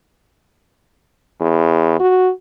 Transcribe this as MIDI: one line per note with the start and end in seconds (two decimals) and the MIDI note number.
1.41 1.97 40
2.00 2.31 66